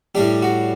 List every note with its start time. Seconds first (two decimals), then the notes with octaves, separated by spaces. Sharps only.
0.15 A2 G3 D4 G4
0.42 F#4